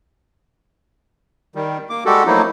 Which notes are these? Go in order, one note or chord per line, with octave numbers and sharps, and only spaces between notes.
D#3 G3
A#3 D6
G3 G#3 F#4 G4 A4
F3 F#3 A3 A#3 D#4 E4